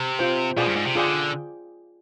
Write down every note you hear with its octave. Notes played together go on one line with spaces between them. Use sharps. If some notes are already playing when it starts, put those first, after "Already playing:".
Already playing: C3
F4 C5 G5
B2 F4 G#4 D5 G5
G2
G#2
C3
D3 F4 G#4 D5 G5